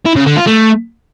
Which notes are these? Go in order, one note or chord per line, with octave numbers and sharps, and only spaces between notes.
E4
C#3
D3
F4
A3